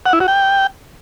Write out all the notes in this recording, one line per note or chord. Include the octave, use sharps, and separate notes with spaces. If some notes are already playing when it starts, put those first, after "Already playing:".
F#5
E4
F#4
G5